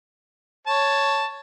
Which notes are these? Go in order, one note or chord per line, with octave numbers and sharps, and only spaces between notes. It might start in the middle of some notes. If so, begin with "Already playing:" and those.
C#5 A5